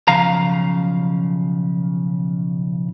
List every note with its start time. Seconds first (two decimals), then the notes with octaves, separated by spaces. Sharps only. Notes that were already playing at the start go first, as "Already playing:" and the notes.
0.08 B1 C#3 F3 F5 A#5